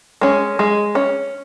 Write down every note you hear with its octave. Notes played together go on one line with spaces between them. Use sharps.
G#3 C#4
G#3
C#4